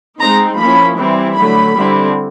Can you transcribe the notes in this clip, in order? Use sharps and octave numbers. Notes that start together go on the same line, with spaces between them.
G#3 C4 D#4 A#5
F3 A#3 C#4 E4 B5
E3 G3 C4 E4
D3 F#3 A3 B5
D3 G3 C4 E4